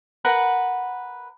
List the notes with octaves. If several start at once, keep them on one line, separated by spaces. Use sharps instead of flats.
A#4 B4 F#5 B5